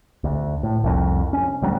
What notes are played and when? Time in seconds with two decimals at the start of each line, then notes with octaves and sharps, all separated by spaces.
0.24 D2
0.63 A2
0.84 C2 F2
1.33 C#4
1.62 D2 F#3 G3